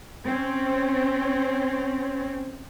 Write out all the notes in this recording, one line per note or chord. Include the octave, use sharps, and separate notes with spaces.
C4 C#4